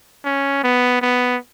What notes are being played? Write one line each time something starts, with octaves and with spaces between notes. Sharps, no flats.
C#4
B3
B3